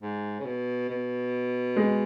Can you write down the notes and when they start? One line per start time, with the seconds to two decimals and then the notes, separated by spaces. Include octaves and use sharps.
0.02 G#2
0.40 C#3
0.45 B2
0.89 B2
1.76 G#3